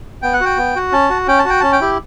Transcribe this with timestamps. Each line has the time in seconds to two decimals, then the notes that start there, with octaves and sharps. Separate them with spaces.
0.22 B3 G5
0.33 F#5
0.40 F#4 G5
0.57 B3
0.76 F#4
0.92 C#4 A5
1.10 F#4
1.28 C#4 G5
1.39 A5
1.45 F#4 G5
1.61 C#4 A5
1.72 G5
1.81 E4 G4